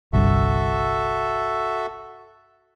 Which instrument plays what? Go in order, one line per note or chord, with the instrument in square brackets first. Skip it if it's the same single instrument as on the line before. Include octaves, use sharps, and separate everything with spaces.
[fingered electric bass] G1 C2 G2 [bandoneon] F#4 A4 E5